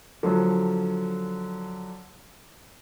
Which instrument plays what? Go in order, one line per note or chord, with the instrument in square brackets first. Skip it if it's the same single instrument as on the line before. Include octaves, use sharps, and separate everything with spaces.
[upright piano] D3 F3 F#3